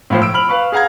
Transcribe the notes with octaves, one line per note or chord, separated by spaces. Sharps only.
A2 F3 C5
E6 D7
B5 F6 F#7
B4 F5 C#6
G#4 F5 F#5 A#5 G#6